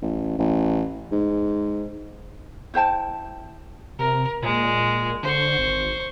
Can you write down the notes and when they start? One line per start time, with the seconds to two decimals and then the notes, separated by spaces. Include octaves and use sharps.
0.02 A1
0.39 A1
1.12 G#2
2.74 E4 C5 G5 A5
3.99 C3 A#4
4.43 A#2 G#3
5.23 D3 C5 C#6
5.58 G#1